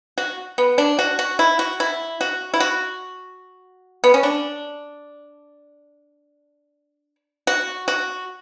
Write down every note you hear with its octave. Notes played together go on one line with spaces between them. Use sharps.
F#4
B3
D4
F#4
F#4
E4
F#4
E4
F#4
E4
F#4
B3
C#4
D4
F#4
F#4